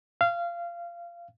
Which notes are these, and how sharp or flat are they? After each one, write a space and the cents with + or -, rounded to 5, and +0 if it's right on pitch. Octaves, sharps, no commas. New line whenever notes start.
F5 -20